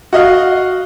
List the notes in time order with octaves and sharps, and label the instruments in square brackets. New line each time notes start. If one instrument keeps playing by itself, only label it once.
[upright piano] F#4 D#5 F5